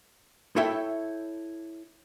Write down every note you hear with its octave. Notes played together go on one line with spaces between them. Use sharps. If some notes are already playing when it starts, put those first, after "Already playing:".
E4 A4 C#5 E5 G5